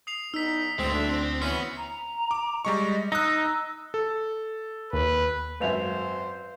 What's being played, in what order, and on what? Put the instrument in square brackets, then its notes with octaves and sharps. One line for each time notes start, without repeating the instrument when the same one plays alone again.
[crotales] D#6 C7 F7
[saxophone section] E2 [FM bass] D#4 [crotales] E6 B6
[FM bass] D2 [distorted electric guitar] G2 G#3 [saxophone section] C4
[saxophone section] A2 A3 D4 [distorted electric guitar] E5
[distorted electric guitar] C4
[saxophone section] E3 C#4 [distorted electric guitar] B3 [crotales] B6
[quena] A#5
[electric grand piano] D6
[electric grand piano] G3 G#3 C#6 [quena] D#5
[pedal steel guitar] D#4 [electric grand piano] A#5 D#6 F#6 [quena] E6
[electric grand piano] A4
[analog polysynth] D#2 [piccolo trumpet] B4
[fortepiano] G#1 F#2 E5 [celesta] B4 F5 F7 [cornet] C5